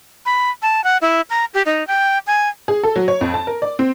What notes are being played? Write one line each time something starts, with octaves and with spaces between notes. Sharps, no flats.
B5
A5
F#5
E4
A#5
G4
D#4
G5
G#5
G#4
A4
F#3
C#5
F2
A5
A#4
D5
C4